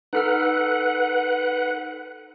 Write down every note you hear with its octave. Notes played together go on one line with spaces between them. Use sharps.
D#4 A4 B4 F#5 F6